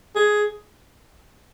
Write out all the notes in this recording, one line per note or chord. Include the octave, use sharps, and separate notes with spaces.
G#4